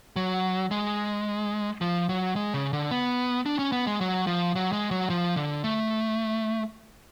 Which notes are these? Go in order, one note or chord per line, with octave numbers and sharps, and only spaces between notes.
F#3
G#3
F3
F#3
G#3
C#3
D3
B3
D4
C#4
B3
G#3
F#3
F3
F#3
G#3
F#3
F3
D3
A3